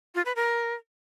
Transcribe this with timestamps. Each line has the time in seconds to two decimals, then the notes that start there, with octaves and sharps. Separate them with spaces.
0.15 F4
0.25 B4
0.36 A#4